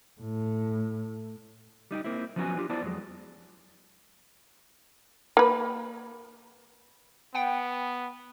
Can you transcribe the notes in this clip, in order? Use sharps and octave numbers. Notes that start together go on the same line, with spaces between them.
A2
G3 D#4 E4 G4
A#3 C4 E4
F3 F#3 B3 C#4 F#4 G#5
D4 F4 G4
B3 E4 C5 D5 A5
F2 F#3 G#3
A#3 B4
B3 F#5 G5